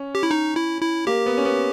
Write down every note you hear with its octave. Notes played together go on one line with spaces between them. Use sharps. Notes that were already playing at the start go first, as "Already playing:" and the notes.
Already playing: C#4
G4
E4
D#4
E4
E4
A#3 G4
B3
C#4
B3